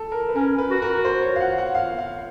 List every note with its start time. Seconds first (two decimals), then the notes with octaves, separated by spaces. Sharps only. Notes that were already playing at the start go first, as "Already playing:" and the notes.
Already playing: A4
0.12 A#4
0.29 B4
0.36 C#4 A#4
0.58 B4
0.71 F#4
0.82 A#4
1.05 C5
1.22 C#5
1.36 F5
1.40 F#5
1.58 F#5
1.75 F5
1.99 F5